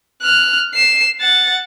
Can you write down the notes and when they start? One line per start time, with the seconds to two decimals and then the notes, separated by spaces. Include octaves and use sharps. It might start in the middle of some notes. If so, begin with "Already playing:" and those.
0.22 F6 F#6
0.74 C7 E7
1.20 F#5 A6